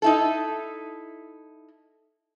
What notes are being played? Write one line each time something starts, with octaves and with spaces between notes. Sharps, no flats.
D#4 E4 A4